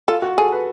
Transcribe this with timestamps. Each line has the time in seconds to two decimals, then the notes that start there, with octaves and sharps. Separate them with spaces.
0.08 F4 A4
0.22 F#4
0.37 G#4 A4
0.52 B4